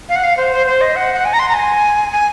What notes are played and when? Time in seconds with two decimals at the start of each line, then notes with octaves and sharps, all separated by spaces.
0.09 F5
0.16 F#5
0.24 F5
0.37 C5
0.52 C5
0.66 C5
0.81 D#5
0.96 F#5
1.14 F#5
1.25 G#5
1.33 A#5
1.39 C6
1.49 A#5
1.54 G#5
2.12 G#5